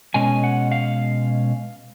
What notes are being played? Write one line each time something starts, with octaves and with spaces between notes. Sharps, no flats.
B2 G#3 C#4 G#5
F#5
F5